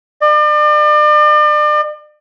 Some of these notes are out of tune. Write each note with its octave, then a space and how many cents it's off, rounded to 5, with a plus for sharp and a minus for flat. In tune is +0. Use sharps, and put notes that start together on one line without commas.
D5 +40